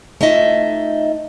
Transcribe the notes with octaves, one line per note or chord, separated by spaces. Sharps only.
A3 D#4 F4 D#5 E5